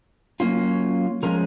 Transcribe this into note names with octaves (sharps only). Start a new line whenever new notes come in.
F#3 A#3 C#4 F4
F3 G#3 C#4 A#4